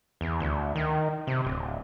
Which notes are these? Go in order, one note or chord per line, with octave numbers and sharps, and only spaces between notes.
E2
D2
D#3
C3
D1